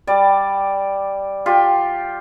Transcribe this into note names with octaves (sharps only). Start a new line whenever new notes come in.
G3 D5
F4 G4